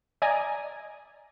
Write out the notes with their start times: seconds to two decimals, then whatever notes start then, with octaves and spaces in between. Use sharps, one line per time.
0.22 D5 D#5 G#5 A#5 D#6